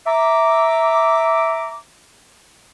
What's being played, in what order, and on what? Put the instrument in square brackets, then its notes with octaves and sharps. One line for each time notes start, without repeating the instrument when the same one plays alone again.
[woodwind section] E5 A#5 D6